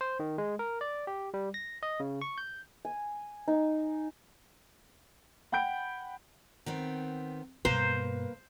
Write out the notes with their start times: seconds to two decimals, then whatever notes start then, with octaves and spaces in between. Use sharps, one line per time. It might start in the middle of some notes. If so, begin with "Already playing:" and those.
0.01 C5
0.20 D#3
0.38 G#3
0.59 A#4
0.81 D5
1.07 G4
1.34 G3
1.54 A#6
1.83 D#5
2.00 C#3
2.22 C#6
2.38 G6
2.85 G#5
3.48 D#4
5.52 F#5 G5 B5 G6 D7
6.66 D#3 B3 C4
7.65 G2 B2 A#3 B4 C5 A#5